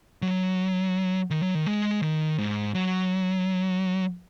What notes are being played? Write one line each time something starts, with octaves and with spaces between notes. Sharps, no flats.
F#3
D#3
F#3
D#3
G#3
D#3
G#2
F#3